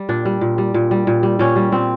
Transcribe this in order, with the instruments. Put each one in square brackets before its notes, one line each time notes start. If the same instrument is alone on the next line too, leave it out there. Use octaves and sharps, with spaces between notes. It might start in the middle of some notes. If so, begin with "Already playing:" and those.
Already playing: [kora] G3
A#2 D4
G3
A#2
G3
A#2
G3
A#2
G3
A#2 C#4
G3
A#2 C4